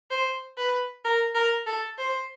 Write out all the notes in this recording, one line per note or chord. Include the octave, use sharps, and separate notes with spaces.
C5
B4
A#4
A#4
A4
C5